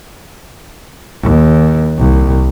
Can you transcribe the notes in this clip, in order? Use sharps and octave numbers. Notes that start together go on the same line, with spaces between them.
D#2
C2